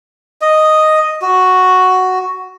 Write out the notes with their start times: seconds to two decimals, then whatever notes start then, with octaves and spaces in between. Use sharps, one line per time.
0.41 D#5
1.22 F#4